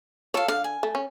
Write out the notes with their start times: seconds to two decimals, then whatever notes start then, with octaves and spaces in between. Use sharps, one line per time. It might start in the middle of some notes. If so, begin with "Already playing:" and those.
0.34 F4 A4 C#5 F5
0.48 D3 F5
0.64 G#5
0.83 A3
0.95 C#4